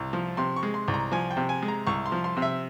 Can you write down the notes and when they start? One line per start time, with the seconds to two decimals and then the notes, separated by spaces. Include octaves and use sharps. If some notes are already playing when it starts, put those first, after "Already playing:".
Already playing: C2
0.13 F3
0.37 C3 C6
0.56 C#6
0.63 G#3
0.74 C6
0.88 C2
0.94 A#5
1.11 F3 G#5
1.31 G5
1.37 C3
1.49 G#5
1.62 G#3
1.68 A#5
1.87 C2 C#6
2.06 C6
2.12 F3
2.24 C6
2.37 C3
2.42 E5